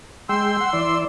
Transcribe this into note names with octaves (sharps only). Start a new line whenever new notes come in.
G#3 G5 C6 E6
F#5
E3 D5